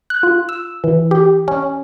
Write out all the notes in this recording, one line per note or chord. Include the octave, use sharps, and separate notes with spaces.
F#6
F4
E6
E3
G4
C#4